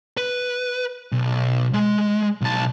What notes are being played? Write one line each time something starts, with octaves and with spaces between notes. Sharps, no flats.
B4
B1
G#3
B1 A5